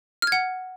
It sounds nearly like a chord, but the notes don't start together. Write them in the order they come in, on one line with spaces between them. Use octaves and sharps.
F6 G#6 F#5